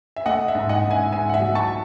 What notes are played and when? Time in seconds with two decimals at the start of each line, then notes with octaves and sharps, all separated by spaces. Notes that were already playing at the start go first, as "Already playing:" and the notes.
0.16 E5
0.26 A3 D#5 F#5
0.48 E5
0.55 G#2
0.69 D#5 F#5
0.84 G#2
0.91 E5 G#5
1.12 G#2 E5 G#5
1.29 F#5
1.34 E5
1.40 F#3
1.55 A5 C#6